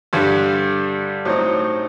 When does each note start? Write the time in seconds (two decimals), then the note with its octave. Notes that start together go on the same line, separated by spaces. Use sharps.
0.13 G2 D3 G3 D4
1.25 A2 F#3 C4 D#4